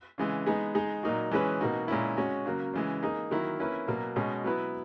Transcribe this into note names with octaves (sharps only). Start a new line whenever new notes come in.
C#3 E3 G#3
G#3 B3 D#4 G#4
G#3 D#4 G#4
A#2 F#3 A#3 D#4 F#4
E3 G#3 C#4 G#4 B4
B2 A#3 D#4 F#4
A#2 G#3 C#4 E4
G#3 C#4 F#4
C#3 F#3 A#3
C#3 E3 G#3
A#3 D#4 G#4
D#3 F#3 A#3 E4
A#3 C#4 E4 B4
B2 F#3 A#3
B2 G#3 C#4
F#3 B3 E4 B4